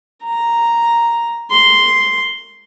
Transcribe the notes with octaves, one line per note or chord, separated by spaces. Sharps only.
A#5
C6